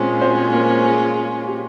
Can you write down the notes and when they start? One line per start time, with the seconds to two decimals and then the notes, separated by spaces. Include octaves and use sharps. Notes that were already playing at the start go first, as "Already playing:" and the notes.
Already playing: A#2 G#3 C4 C#4 F4
0.21 C4 C5
0.53 A#3 A#4
0.85 G#4
1.47 G4